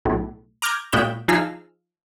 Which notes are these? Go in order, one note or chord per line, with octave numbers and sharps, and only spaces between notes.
B1 A2
A#5 D6 F6 G6 G#6 A#6
A#2 G#3 F#4 G5 B5 E7
F3 D#4 F4 G#4 E6 F6